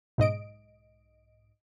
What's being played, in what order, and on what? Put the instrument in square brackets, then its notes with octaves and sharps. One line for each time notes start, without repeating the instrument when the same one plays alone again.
[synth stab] B1 G#2 D#5 D7